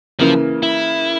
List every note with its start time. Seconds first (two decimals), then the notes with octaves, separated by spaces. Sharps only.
0.19 C#3 E3 F3 A#3
0.63 E4